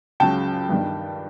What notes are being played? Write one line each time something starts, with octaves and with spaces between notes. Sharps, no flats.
C#2 C#3 F#3 G5 A5
G2 D#3 G3